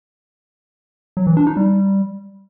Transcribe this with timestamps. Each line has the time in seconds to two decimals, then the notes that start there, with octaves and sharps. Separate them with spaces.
1.17 F#3
1.27 E3
1.37 D4
1.47 D#4
1.57 G3